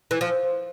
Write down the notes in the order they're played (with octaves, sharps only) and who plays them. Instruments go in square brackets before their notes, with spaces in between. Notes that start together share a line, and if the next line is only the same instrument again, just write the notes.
[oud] E3
F3